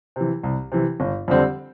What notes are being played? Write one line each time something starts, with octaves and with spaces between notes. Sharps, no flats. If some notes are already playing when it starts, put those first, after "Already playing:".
C3 E3
C2
C3 E3
G1
F2 D3 G3 C4